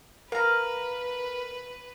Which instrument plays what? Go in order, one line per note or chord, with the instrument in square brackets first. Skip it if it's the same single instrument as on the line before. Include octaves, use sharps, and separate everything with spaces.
[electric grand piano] A#4 [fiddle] B4 [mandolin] F5 A#5